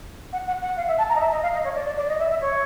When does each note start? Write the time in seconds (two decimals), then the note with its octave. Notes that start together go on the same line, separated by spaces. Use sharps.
0.33 F#5
0.47 F#5
0.62 F#5
0.77 F5
0.87 E5
0.98 A5
1.09 A#5
1.16 D#5
1.20 E5
1.31 D#5
1.42 F5
1.53 D#5
1.64 C#5
1.75 D5
1.86 D5
1.97 D5
2.08 D#5
2.19 E5
2.30 E5
2.41 C#5